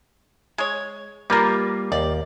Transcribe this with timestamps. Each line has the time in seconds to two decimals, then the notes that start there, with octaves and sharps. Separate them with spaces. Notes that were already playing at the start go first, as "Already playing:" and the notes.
0.58 G#3 C#5
1.30 G3 A#3 F4 A#4 B4
1.92 D#2 D5